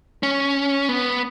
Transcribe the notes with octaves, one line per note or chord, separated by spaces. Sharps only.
C#4
B3